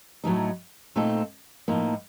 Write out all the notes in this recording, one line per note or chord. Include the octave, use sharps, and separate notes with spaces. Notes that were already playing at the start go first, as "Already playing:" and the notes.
A2 F#3 A3 D#4
A#2 A3 C4 D#4 A4
A2 F3 A#3 D#4